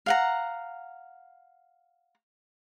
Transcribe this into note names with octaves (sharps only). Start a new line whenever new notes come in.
F5 F#5 A#5